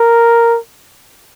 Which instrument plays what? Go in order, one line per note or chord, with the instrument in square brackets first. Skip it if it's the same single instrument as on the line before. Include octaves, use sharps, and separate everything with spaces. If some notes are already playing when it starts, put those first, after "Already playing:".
Already playing: [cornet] A#4